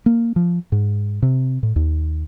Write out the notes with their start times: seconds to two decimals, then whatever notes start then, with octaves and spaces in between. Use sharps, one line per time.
0.06 A#3
0.36 F3
0.72 G#2
1.22 C3
1.63 A2
1.76 D#2